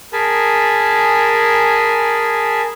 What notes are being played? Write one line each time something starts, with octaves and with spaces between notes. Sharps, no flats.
G#4 A#4 G#5 A5 B5